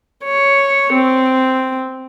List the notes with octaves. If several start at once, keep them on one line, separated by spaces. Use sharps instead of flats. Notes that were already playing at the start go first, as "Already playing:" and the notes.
C#5
C4